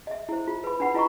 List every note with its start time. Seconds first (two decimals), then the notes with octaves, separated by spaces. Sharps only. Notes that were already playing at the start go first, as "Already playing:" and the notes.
0.07 D#5 E5
0.29 E4 C5
0.48 F4
0.64 B4 B5
0.80 D4 B4 F#5 B5
0.94 E4 F4 D#5 A#5 B5 C#6